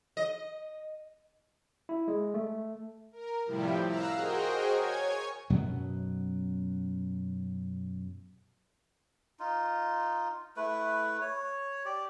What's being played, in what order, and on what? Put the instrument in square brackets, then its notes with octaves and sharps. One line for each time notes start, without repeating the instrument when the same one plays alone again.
[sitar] D#5
[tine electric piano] E4
G#3
A3
[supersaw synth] A#4
A2 C3 F3 G3 E4 G4
F5 A#5 E6 F#6
F#4 G#4 A#4 C5 D#5 G5
C#5 G#5 G#6
[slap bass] F#2 B2 F#3 B3
[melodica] D#4 F4
A3 E4 B4
C#5
G4 D5